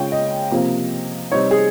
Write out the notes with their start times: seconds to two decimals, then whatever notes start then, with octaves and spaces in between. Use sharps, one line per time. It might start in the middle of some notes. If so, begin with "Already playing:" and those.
Already playing: C#3 G#3 C#4 F4 G5
0.12 D#5
0.51 C3 F3 A#3
1.31 C3 G3 C4 D#4 C#5
1.51 G#4